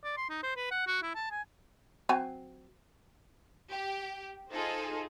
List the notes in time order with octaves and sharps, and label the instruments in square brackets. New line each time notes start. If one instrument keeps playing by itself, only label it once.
[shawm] D5
C6
D#4
C5
B4
F#5
F#4
E4
A5
G#5
[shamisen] F#3 C4 G#5
[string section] G4
D#4 F4 G#4 A4 C5